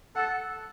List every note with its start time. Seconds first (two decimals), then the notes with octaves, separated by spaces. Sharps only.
0.16 A4 F#5